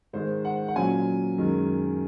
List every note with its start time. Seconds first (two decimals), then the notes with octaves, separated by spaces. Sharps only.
0.13 G#2 D#3 G#3 C5
0.45 F#5
0.68 F#5
0.76 A#2 F#3 C#4 G#5
1.38 F#2 D#3 G#3